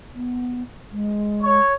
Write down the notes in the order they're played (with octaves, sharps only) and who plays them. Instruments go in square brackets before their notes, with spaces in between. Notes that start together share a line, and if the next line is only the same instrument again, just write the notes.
[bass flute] B3
G#3
[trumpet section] C#5